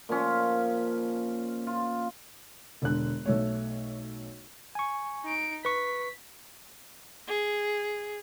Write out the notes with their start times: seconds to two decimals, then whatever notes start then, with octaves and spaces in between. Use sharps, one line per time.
0.09 A#2 F3 C#4
1.67 F4
2.82 E1 D3 F#6
3.25 B1 A3 C#5
4.75 G#5 C#6
5.25 D#4 D7
5.65 B4 C#6 B6
7.28 G#4